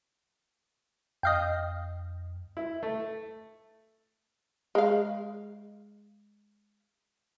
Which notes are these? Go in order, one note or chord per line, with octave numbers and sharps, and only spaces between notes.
F2 D#5 F5 G5
E4
A3
G#3 F5